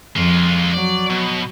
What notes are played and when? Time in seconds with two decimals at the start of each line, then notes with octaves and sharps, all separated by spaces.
0.16 F2 G#3 F4
0.73 F#3 D5
1.10 B2